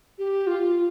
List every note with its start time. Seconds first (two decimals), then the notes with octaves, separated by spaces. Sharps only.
0.19 G4
0.47 F4